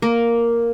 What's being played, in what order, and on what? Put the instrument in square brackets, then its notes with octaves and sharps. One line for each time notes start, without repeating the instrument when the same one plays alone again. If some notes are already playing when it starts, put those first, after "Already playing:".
[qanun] A#3 A#4